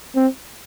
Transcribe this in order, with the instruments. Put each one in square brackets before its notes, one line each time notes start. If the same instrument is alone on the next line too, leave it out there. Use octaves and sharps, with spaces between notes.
[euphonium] C4